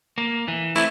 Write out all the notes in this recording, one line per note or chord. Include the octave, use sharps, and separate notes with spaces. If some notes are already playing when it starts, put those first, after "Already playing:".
A#3
E3
A3 C4 E4